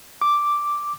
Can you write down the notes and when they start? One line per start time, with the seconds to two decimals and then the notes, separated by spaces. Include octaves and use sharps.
0.21 D6